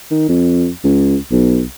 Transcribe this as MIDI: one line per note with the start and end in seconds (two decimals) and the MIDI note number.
0.11 0.27 51
0.29 0.70 41
0.84 1.17 37
1.32 1.65 35